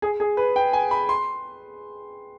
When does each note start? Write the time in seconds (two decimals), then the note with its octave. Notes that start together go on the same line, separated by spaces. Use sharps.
0.02 G#4
0.20 G#4
0.37 B4
0.56 G5
0.73 G#5
0.91 B5
1.09 C6